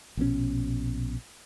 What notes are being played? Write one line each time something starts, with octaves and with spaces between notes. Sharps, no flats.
A#1 B2 D3 C#4